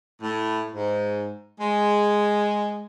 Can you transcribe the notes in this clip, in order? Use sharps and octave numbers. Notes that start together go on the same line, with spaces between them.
A2
G#2
G#3